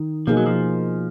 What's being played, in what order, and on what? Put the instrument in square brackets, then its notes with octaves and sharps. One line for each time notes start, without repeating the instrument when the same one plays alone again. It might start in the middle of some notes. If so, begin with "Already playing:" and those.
Already playing: [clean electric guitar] D#3
[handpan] B2 A#3 D#4 G#4 [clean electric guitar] F3
[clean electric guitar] F#3
F3